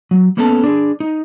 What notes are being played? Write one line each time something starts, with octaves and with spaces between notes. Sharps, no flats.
F#3
A#3 B3 C#4 A4 G#5 A5
D4 G#4
D#4